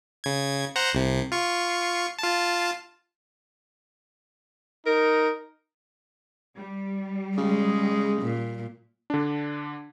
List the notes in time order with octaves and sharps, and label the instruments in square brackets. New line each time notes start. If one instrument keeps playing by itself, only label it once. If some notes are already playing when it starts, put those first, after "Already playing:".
[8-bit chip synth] C#3 G#6
C5 F#5 A#5
C2 C3
F4 C#6
F4 A5
[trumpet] D#4 [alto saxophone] A#4
[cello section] G3
[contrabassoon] C#3 [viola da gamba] G#3
[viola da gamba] A#2
[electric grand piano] D3 D4